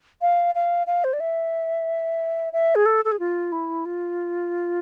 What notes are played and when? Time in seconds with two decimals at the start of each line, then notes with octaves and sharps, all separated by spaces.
0.21 F5
0.55 F5
0.87 F5
1.04 C5
1.13 D5
1.20 E5
2.53 E5
2.75 G#4
2.86 A4
3.05 A4
3.12 G#4
3.20 F4
3.52 E4
3.85 F4